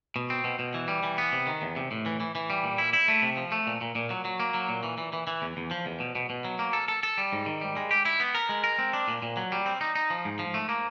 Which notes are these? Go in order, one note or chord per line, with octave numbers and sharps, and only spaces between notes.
B2
C4
B2
B2
E3
G3
E3
B3
C3
D#3
E2
C3
A2
E3
E3
E3
G3
A#2
E4
E4
A3
C3
F3
A3
A#2
A#2
A#2
F#3
F#3
A#3
F#3
A#2
E3
E3
E3
E3
E2
E2
F3
E2
B2
B2
B2
F#3
A#3
A4
A4
A4
G3
G#2
D#3
G3
G#3
G4
E4
B3
A#4
G#3
A#4
C4
D4
A#2
A#2
F#3
G3
C4
D#4
D#4
F3
G#2
F3
A3
A#3